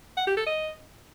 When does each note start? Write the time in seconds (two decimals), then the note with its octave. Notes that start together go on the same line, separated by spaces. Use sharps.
0.17 F#5
0.27 G4
0.37 A4
0.47 D#5